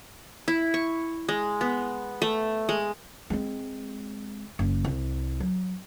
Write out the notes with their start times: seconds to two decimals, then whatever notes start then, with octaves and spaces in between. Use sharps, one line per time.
0.48 E4
0.74 C#6
1.28 G#3
1.61 B3
2.22 A3
2.69 G#3
3.30 G#3 C4
4.59 F#1
4.84 C2
5.40 F#3